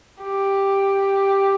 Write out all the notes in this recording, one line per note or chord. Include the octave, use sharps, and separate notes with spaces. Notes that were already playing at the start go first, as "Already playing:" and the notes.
G4